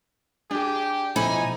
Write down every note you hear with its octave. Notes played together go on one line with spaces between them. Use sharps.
D4 G4 G#4
B2 F3 D#4 E4 A4 C5 G#5 B5